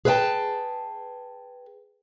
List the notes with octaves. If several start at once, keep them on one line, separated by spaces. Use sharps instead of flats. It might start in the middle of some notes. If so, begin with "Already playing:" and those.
G#4 B4 C5 E5 G5 A5